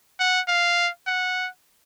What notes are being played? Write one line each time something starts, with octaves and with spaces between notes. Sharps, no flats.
F#5
F5
F#5